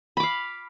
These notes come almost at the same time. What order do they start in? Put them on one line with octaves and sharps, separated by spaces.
B5 D6 F5